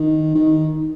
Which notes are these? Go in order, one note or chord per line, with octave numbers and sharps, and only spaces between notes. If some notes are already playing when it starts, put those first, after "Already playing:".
Already playing: D#3
D#3